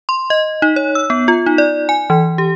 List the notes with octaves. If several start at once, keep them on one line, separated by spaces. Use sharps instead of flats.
C6
D#5
D#4
C#5
E6
B3
F4
D#4
D5
G#5
E3
G4